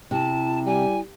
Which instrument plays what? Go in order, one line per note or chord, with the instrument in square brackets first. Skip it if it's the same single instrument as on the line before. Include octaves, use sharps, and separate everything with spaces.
[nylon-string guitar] C3 [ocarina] E4 [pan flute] A5
[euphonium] G3 [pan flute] G#5